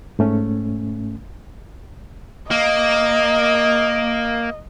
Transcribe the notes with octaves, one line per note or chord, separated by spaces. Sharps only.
G#2 A3 C#4
A#3 D#5